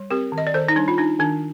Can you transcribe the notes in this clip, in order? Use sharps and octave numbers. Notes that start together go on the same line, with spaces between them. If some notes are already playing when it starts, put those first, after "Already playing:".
Already playing: G3
C4 G4 A#4
D#3
D#5
D5
D#3 A4 C5
D#4
G3 D4
F4
D4 D#4
D#3 D4